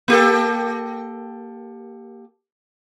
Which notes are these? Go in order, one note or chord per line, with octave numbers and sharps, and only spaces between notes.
A#3 G4 A4